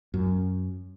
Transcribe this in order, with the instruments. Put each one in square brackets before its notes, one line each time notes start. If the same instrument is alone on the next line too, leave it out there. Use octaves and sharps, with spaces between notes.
[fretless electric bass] F#2